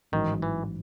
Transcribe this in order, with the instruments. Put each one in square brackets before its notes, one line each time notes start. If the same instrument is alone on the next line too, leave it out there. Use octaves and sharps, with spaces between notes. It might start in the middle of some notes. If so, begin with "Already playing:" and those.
[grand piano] A1 G#2 F#3 [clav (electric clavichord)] D#3
[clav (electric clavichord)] E3